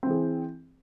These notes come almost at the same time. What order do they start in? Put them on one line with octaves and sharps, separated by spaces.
C4 E3 G#4